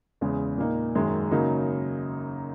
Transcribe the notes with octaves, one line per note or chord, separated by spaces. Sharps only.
E2 C#3 G#3
A#2 A#3 D#4
F#2 D#3 G#3
C#3 F#3 A#3 D#4